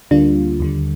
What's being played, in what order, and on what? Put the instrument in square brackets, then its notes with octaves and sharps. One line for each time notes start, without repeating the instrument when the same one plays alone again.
[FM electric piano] D2 D3 G3 A#3 F4 [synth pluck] D4
[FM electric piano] D#2 D3 G3